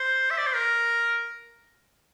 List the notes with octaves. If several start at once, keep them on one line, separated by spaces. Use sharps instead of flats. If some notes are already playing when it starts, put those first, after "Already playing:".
Already playing: C5
E5
D5
C5
A#4